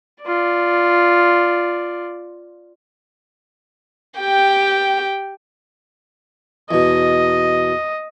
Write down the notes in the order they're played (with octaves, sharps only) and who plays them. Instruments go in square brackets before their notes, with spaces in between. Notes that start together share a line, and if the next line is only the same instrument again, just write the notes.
[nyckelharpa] F4 D5
[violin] G4 G5
[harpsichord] E2 B2 [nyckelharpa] D#5